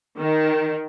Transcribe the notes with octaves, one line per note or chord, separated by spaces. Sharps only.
D#3